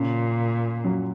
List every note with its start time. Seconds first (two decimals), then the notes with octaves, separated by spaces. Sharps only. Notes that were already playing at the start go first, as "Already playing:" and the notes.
Already playing: A#2 C#3 C#4
0.84 F#2 F#3